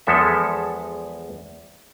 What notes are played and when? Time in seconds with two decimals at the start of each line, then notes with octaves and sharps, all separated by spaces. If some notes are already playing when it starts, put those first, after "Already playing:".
0.07 E2 F3 G#3 A4 E5